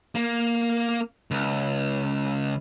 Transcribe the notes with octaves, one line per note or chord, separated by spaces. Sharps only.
A#3
C#2